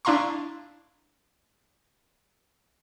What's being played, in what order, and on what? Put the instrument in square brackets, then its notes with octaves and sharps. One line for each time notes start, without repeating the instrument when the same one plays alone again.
[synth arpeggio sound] D4 E4 F5 A#5 C6 C#6